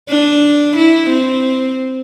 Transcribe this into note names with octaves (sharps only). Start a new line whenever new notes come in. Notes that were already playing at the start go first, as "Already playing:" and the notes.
D4
E4
C4